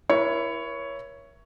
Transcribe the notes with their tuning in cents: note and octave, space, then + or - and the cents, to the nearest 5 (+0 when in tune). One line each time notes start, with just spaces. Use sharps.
E4 +15 A#4 +40 C#5 +5